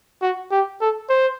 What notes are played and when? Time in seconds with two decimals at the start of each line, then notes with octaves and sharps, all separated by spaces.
0.22 F#4
0.51 G4
0.81 A4
1.09 C5